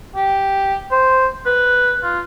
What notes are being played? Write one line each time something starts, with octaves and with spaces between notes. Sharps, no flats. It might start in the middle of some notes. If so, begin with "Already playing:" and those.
G4
C5
B4
F4